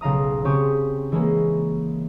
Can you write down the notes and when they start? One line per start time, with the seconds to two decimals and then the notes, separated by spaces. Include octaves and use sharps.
0.01 B1 C#3 F5 A#5 D#6
0.45 C#3 C4 G4 C#6 D#6
1.12 E3 G#3 A#3 C#4